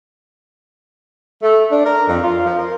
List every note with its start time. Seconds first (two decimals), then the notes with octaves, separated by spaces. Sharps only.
1.42 A3
1.71 D4
1.84 A#4
2.08 F2
2.23 F4
2.46 F3
2.57 A#4